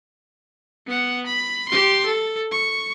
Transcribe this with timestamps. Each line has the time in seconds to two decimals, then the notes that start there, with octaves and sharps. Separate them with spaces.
0.87 B3 F#5
1.26 B5
1.69 G4 C6
2.06 A4
2.51 C#6